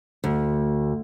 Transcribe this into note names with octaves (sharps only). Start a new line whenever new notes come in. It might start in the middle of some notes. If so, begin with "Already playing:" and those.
D2